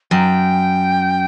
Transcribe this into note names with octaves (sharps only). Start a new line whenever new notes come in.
F#2 G5